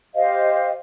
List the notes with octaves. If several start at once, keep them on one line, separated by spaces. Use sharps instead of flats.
G4 C5 D#5 F5